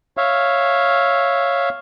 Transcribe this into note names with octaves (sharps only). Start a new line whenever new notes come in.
C#5 E5 F5